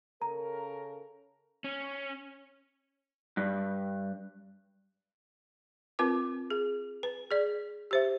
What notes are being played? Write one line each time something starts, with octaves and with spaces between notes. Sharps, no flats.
C#3 A4 A#4 A#5
C#4
G2
C4 F4 A#4 B4 D6
G#4
B4
G#4 D5
G4 C5 E5